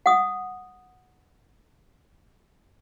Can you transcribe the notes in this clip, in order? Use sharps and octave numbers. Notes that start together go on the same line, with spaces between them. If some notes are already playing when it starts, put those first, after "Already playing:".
F#5 D#6